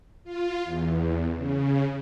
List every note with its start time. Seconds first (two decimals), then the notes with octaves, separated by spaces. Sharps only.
0.24 F4
0.65 E2
1.36 C#3